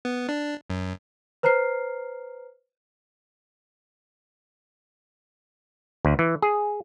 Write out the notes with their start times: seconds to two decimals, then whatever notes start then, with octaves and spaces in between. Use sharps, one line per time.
0.05 B3
0.29 D4
0.70 F#2
1.43 B4 C5 A#5 F6 C7
6.05 D2
6.19 E3
6.42 G#4